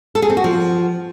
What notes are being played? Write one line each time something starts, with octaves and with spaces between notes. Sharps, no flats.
A4
G#4
C4
F#4
F3